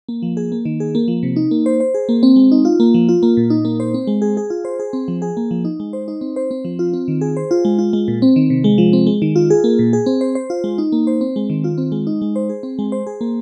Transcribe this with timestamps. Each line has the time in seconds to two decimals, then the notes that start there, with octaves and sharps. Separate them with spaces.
0.09 A#3
0.22 F3
0.37 G#4
0.52 A#3
0.65 D#3
0.80 G#4
0.95 A#3
1.08 F3
1.23 C3
1.36 D#4
1.51 A#3
1.66 C5
1.80 C5
1.94 G#4
2.09 A#3
2.23 C4
2.36 G#3
2.52 D#4
2.65 F4
2.80 A#3
2.94 F3
3.09 F4
3.23 A#3
3.37 A#2
3.50 D#4
3.65 A#3
3.80 C5
3.94 C4
4.07 G#3
4.22 G#4
4.37 G#4
4.50 F4
4.65 C5
4.79 G#4
4.93 C4
5.08 F3
5.22 G#4
5.37 A#3
5.51 F3
5.65 D#4
5.80 G#3
5.93 C5
6.08 D#4
6.21 C4
6.36 C5
6.51 C4
6.65 F3
6.79 F4
6.93 C4
7.08 D#3
7.21 G#4
7.37 C5
7.51 F4
7.65 G#3
7.79 F4
7.93 G#3
8.08 A#2
8.22 C4
8.36 D#3
8.50 C3
8.64 G#3
8.78 F3
8.93 C4
9.07 G#3
9.22 D#3
9.36 F4
9.50 G#4
9.64 A#3
9.79 A#2
9.93 G#4
10.06 C4
10.21 C5
10.35 C5
10.50 F4
10.64 G#3
10.78 D#4
10.92 A#3
11.07 C5
11.21 C4
11.36 G#3
11.50 D#3
11.64 F4
11.78 C4
11.92 G#3
12.07 D#4
12.22 G#3
12.36 C5
12.49 G#4
12.63 C4
12.79 G#3
12.92 C5
13.07 G#4
13.21 A#3